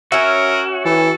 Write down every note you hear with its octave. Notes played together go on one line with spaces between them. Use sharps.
C#4 F#4 A#4 E5
E3 A4